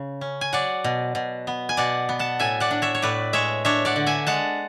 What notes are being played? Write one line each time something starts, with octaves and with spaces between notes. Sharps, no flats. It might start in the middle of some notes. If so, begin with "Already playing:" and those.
Already playing: C#3
C#4
G#5
F#3 D5 F#5
B2
B2
B3
G#5
B2 D5 F#5
B3
F#5 A5
A2 E5 G#5
D5 F#5
D4
C#5 E5
C#5
A2 B4 D5
G#3 C#5 E5
D4 C#5 E5
D5 F#5
D3
E5 G#5
G#3 F#5 A5